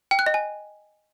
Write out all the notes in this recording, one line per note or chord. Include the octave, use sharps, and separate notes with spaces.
G5
F#6
D#5
G#5